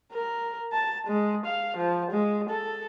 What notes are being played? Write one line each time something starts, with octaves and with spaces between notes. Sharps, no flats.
A#4
A5
G#3
F5
F3
G#3
A4